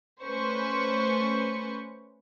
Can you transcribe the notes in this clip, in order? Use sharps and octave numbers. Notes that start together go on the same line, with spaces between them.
A3 C#4 B4 C5 C#6